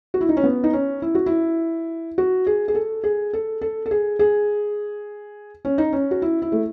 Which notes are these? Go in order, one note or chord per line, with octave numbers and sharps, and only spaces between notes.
F#4
E4
D#4
C#4
B3
D#4
C#4
E4
F#4
E4
F#4
G#4
G#4
A4
G#4
A4
A4
A4
G#4
G#4
C#4
D#4
C#4
F#4
E4
E4
A3